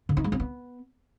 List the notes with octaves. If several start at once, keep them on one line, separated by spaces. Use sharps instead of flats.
D3
D#4
G#3
C4
B3